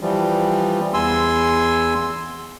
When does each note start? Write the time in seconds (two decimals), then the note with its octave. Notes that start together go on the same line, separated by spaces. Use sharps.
0.01 E3 F3 G3
0.94 E2 G#5 C6 E6